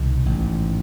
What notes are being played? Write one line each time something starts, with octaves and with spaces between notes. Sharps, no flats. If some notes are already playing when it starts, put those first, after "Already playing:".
Already playing: C2 B2 D#3
A1 G#2